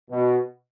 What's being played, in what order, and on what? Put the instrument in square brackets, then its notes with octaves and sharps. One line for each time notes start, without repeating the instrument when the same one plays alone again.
[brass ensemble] B2